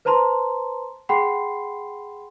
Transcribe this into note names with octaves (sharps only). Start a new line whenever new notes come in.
B4 C5 A5 A#5 C6
G#4 F#5 G5 B5 C6 C7